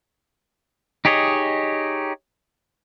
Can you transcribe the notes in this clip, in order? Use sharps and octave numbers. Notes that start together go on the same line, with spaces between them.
D#4 G4 G#4 C#5 D#5